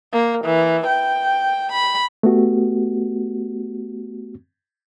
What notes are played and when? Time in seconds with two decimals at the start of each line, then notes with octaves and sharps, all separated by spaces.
0.13 A#3
0.45 E3
0.87 G5
1.72 B5
2.23 A3 B3 F#4 G4